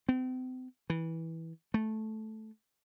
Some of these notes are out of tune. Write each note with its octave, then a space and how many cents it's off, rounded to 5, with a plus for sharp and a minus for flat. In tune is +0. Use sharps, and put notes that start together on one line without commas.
C4 -40
E3 -15
A3 -10